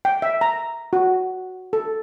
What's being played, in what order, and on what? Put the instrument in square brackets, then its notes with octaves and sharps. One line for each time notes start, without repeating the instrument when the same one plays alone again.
[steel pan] G5
E5
A#5
F#4
A4